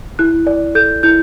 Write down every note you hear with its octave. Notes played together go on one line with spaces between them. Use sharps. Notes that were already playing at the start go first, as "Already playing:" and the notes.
E4 F#6
D5
A4 G6
E4 G6